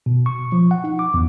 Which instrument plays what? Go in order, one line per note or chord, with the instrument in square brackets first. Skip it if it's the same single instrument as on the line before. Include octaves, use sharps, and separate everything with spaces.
[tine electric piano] B2
C#6
F3
F#5
D#4
D6
E2